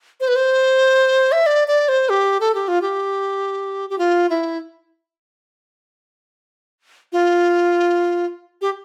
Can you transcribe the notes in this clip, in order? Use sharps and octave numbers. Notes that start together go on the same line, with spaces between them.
C5
B4
C5
E5
D5
D5
C5
G4
A4
G4
F4
G4
G4
F4
E4
F4
G4